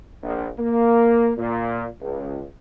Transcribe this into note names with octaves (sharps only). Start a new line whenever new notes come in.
A#1
A#3
A#2
C#2